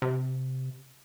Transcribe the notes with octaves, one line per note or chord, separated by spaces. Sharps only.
C3